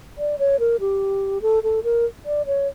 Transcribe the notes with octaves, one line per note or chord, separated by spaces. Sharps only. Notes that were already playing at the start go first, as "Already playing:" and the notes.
D5
C#5
A#4
G4
A4
A4
A#4
D5
C#5